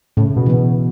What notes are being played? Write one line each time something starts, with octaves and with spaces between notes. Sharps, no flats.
A2 C#3
B2
E3 B3
B2